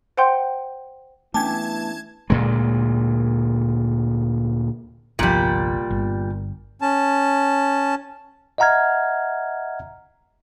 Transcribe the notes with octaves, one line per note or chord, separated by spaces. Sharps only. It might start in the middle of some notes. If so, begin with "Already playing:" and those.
C5 F#5 G5 C6 G6
E3 A3 B3 C#4 D4 A5 D6 G#6
D2 A#2 G#3
G1 C2 A#2 F3 G3
G1
C#4 A5
D#5 E5 F#5 A#5 F6 G#6